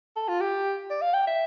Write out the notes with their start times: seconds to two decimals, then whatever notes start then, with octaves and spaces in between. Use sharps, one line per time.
0.16 A4
0.28 F4
0.41 G4
0.90 D5
1.02 F5
1.14 G5
1.27 E5